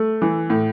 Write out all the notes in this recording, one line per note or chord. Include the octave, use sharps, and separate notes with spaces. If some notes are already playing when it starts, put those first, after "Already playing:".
Already playing: A3
E3
A2